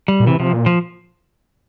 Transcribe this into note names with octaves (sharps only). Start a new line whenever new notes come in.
G3
A#2
C3 E3
C3 F3
A#2
F3